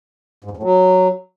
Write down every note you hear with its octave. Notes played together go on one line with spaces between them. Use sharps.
G#2
E2
A2
F#3